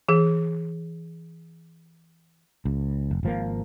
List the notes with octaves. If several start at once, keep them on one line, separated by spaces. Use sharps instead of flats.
E3 G#4
C#2
F1
G#1 F3 A#3